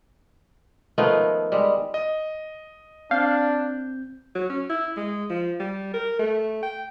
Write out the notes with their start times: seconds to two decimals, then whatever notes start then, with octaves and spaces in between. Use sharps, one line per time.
0.98 D#3 F3 A3 B3
1.52 G3 G#3
1.94 D#5
3.11 C4 D4 F5 G6
4.35 F#3
4.50 C#4
4.69 E4
4.97 G#3
5.30 F3
5.60 G3
5.94 A#4
6.19 A3
6.63 G5